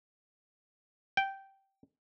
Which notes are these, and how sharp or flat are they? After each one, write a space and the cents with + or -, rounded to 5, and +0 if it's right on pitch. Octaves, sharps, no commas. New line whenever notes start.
G5 -10